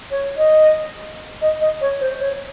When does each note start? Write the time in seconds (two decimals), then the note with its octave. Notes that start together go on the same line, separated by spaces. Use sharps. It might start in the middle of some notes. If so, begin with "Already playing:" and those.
0.10 C#5
0.36 D#5
1.41 D#5
1.60 D#5
1.80 C#5
2.00 C5
2.19 C#5